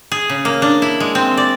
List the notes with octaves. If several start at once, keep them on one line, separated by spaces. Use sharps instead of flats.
G#4
C#3
A#3
D4
E4
G#3
C4
D5